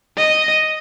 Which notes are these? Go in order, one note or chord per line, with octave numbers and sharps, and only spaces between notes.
D#5